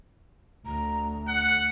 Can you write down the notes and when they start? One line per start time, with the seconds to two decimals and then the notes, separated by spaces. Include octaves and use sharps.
0.66 D2 A#5
1.28 F#5 F#6